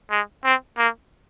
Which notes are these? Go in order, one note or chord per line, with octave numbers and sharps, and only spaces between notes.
G#3
C4
A#3